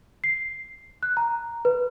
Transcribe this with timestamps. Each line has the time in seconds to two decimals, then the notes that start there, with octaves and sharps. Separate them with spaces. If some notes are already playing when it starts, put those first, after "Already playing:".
0.24 C7
1.03 F#6
1.17 A#5
1.65 B4